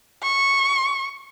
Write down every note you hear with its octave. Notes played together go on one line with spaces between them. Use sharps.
C#6